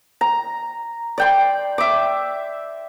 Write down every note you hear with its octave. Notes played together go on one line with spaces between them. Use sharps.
A#5
D5 G5 C6
E5 D6